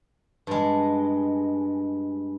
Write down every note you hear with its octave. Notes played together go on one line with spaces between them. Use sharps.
G2 G#3